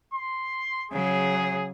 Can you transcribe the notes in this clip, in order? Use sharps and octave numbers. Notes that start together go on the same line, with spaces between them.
C6
C#3 F#3 G#4